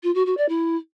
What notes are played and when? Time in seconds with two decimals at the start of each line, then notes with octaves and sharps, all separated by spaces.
0.03 F4
0.15 F#4
0.26 F#4
0.37 D5
0.49 E4